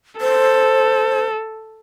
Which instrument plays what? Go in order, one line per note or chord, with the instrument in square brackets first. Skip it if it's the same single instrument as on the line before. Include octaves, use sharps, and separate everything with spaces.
[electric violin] A4 [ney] C5